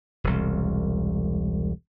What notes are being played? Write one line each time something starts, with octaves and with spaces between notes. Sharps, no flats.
E1 C2